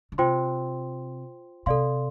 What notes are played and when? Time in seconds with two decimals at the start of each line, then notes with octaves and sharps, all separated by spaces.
0.12 D3
0.18 C3 F4 C5 G5 C6
1.66 C3 A4 D5 F5 C6